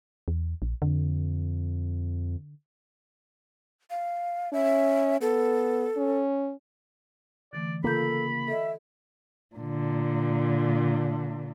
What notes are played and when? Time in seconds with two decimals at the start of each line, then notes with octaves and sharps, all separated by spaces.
0.28 E2
0.62 A#1
0.82 F2 D3
3.90 F5
4.53 C#4 E5
5.21 B3 A4
5.97 C#4
7.53 D3 E3 A3 D5
7.84 C#3 A#3 F4 A4 B5 G6
8.48 A4 D#5 E5
9.55 A#2 D3